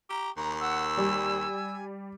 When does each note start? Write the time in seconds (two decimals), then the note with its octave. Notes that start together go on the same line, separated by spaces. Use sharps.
0.10 G4 A#5
0.37 D#2 A#5
0.60 F#5 E6
0.97 G3 G#5